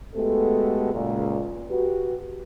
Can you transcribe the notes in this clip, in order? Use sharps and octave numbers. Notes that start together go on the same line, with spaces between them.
G#3 A3 B3 F#4 G4 A4
C#2 A#2
F#4 G4 B4